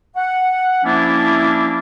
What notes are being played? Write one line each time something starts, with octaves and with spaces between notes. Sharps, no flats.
F#5
F3 A#3 C#4 D4 E4